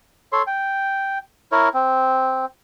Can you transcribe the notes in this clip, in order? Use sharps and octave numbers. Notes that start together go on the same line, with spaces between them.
A4 C#5 C6
G5
E4 A#4 C#5
C4